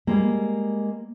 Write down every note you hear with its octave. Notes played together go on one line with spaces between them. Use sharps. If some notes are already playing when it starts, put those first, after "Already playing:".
G3 G#3 A#3